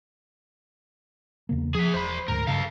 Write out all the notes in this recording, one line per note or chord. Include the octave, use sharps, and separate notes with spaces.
E2 C#3 A#3
F3 G#4 E5
E1 C5 B5
D1 D2 G#2 A#4
G2 C#3 A4 F5